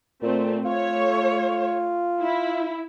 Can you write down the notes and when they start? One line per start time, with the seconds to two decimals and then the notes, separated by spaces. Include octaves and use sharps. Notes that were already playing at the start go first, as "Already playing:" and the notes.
0.22 A#2 A3 C4
0.65 A3 F4 C#5
2.22 E4